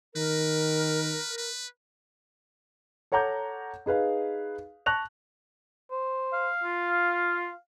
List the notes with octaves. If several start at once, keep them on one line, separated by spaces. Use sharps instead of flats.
D#3 A#4 B4
B4
A4 C#5 F#5 A#5 D6 G6
D#4 G#4 B4 F5
A5 C#6 F#6 A#6 F7
C5
F5
F4